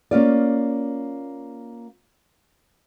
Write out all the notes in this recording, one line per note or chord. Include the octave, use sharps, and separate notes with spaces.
A#3 C#4 F4 D5